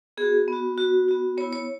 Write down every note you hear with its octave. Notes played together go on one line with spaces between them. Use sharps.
B3 F#4 G#4
B3 F#4
B3 F#4
B3 F#4
B3 E4 C#5
C#5